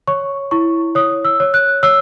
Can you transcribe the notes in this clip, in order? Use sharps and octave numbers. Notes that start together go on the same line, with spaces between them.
C#5 C#6
E4 C#6
C#5 D#6
E6
C#5
F#6
C#5 E6